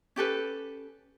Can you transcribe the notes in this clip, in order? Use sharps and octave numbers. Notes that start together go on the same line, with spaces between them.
C#4 G4 A4 B4